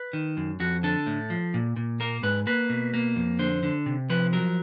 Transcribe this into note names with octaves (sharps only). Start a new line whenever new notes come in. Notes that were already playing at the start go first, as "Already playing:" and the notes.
Already playing: B4
D#3
F#2
F2 F#4
D3 A4
A2
F3
A#2
A#2
A#3 A#4
G#2 B4
A#3 B4
B2
A#3
F2
D3 C5
D3
C3
F3 B4
F#3 A#4